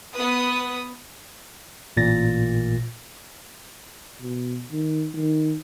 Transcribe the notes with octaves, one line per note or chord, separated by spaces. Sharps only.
B3 B4 D#6
A1 A#2 A6 A#6
B2
D#3
D#3